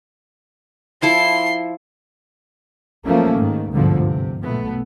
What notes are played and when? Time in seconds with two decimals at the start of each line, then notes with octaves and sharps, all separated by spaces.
1.02 F3 E4 A4 C6
3.05 F3 F#3 A3 A#3 C#4
3.37 G#2 D#3
3.71 G1 D2 G#2 B2 D3 F3
4.05 C3
4.42 B1 B2 A3 B3